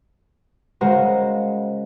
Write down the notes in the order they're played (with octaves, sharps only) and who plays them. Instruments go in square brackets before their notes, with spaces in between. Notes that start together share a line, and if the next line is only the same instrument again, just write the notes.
[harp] C#3 G#3 F#4 A#4 C5